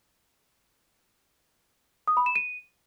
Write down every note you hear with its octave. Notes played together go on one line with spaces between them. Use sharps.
D#6
B5
E7
D#7